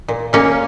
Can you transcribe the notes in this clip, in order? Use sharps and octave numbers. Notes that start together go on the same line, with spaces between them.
A#2
A#2 A#3 C#4